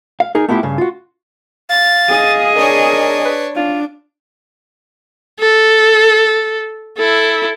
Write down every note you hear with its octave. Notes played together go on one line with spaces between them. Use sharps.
F5
D#4 G#4 A#4
A3 B3 E4 F4 G4
G2 C#3
F4 F#4
F5 A6
G#4 D#5
D4 A#4 C#5
B4
D4 F4
A4
E4 A4